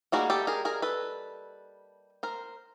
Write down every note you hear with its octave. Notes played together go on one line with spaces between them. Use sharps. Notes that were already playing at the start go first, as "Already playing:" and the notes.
G3 A#3 D#4 F#4 G#4
G4 A4
G#4 A#4
G#4 A#4
A4 B4
A#4 C5